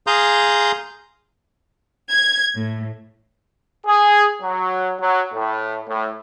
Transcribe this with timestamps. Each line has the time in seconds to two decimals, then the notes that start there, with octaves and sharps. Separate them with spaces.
0.07 G#4 F5 A#5 C6 D#6 G6
2.09 G#6
2.54 A2
3.86 G#4
4.42 F#3
5.00 F#3
5.33 A2
5.87 A2